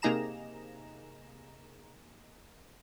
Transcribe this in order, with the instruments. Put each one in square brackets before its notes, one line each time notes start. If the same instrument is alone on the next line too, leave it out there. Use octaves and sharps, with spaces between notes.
[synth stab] C3 A#3 D#4 G#4 A#5 E7